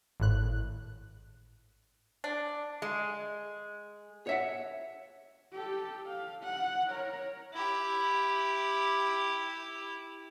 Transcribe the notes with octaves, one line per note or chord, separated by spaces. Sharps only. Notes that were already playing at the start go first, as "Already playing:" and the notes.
G#1 A2 F#6
D4
G#3
C#5 E5 F#5
G4 A4
F5
F#5
A#4 C#5
E4 G4